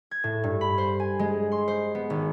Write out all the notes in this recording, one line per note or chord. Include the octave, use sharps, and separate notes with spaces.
G#6
A2
G2
B5
C5
G#5
G#3
C6
C5
B3
G#1